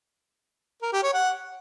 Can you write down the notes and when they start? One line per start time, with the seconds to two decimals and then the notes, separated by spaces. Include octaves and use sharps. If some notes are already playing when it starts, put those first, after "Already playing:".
0.82 A#4
0.93 G4
1.03 C#5
1.13 F#5